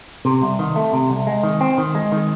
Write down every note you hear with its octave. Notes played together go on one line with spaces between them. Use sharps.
C3
C2
D#3
A3
C3
C2
G#3
D#3
C4
D#3
G#3
D#3